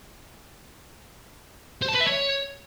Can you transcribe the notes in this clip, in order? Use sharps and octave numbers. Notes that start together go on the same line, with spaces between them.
C5
A5
B4
E5
C#5